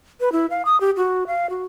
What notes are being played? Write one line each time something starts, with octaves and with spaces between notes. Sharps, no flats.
B4
E4
F5
D#6
G4
F#4
F5
F#4